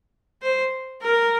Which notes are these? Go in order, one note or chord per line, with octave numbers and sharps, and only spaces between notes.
C5
A#4